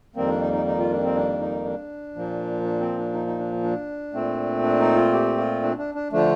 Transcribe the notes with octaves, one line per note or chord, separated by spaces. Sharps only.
F2 D#3 G3 A#3 C4
D4
D#4
D#4
D#4
F4
D4
C4
D4
D#4
D4
A#2 F3 A#3
D4
C4
D4
D#4
D#4
D4
D4
A#2 A3 C4
D4
D#4
F4
G4
F4
D4
D4
D4
D3 F3 A3 D4